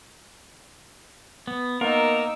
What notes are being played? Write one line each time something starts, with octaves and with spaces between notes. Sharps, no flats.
B3
A#3 B3 D#4 A#4 E6